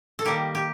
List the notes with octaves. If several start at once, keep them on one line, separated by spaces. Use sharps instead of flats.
A4
D#3 G3 A#3 G4
G4